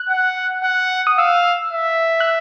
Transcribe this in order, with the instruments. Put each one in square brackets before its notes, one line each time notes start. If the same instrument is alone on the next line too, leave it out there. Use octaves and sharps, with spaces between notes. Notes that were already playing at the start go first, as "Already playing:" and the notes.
Already playing: [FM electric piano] F#6
[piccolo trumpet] F#5
F#5
[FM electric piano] D#6
[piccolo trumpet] F5 [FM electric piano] E6
[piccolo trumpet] E5
[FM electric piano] F#6